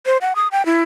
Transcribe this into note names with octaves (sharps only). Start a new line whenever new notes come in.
C5
F#5
D#6
G5
E4